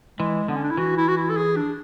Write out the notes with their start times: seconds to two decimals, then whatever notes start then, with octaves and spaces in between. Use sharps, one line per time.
0.19 E3 G#3
0.48 D3 B3
0.56 C#4
0.64 D4
0.71 E4
0.77 E3 F#4
0.97 E4
1.08 F#4
1.17 E4
1.29 A4
1.37 G#4
1.56 D4